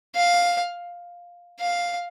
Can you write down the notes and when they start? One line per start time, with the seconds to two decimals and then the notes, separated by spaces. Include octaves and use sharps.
0.16 F5
1.60 F5